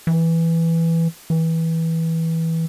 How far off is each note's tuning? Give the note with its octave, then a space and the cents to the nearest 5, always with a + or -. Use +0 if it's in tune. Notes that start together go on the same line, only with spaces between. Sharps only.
E3 +5
E3 -15